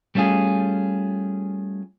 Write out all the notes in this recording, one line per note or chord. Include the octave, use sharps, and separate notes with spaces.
G3 A3 C#4 F4 G#4